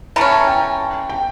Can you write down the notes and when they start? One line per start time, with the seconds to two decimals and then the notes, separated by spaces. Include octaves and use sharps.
0.16 E3 A3 C#4 A#5
0.32 A5
0.47 G5
1.09 G5